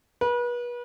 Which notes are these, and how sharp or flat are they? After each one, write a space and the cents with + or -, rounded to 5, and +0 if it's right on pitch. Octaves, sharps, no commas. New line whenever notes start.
B4 -35